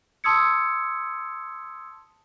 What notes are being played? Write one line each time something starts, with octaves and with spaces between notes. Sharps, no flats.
A5 C6 D#6 E6 G#6 C#7